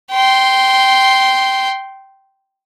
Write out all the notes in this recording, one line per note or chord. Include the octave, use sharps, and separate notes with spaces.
G5 C6